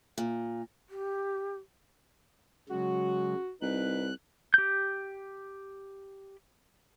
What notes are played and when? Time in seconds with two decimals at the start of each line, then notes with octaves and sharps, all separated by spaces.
0.18 A#2
0.89 G4
2.69 C#3 F#3 G#3 F#4
3.62 C2 D#4 B4 F#6
4.54 G4 G6